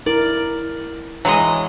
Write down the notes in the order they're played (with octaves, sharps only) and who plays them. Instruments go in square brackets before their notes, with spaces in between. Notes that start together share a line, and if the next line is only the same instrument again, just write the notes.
[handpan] E4 A#4 [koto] D5
[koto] E3 G#3 D#5 [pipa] F#3